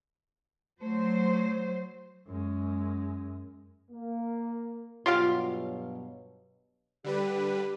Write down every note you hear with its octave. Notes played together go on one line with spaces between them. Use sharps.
F#3 A3 C5
F#2 G#3
A#3
G2 B2 F#3 F4 G4 F5
D3 G3 G4 B4